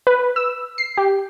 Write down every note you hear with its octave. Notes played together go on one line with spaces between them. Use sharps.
B4
E6
C7
G4